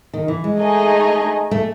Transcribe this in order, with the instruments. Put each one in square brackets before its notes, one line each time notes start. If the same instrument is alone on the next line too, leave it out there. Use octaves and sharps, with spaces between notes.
[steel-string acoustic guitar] D#3
E3
G#3
[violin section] A3 D#4 G#4 D#5 G#5
[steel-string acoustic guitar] A3